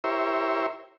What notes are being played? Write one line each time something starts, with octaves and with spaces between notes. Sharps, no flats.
E4 G4 A#4 C5 C#5 E5